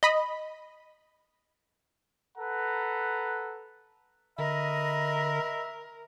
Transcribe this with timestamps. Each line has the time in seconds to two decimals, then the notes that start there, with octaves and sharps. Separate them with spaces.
0.03 D#5 B5
2.38 A4 B4 F#5 A#5
4.38 D3 A#4 D#5 E5 B5